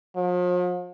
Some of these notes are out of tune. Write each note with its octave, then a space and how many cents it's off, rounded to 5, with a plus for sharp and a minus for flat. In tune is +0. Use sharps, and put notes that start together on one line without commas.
F3 +45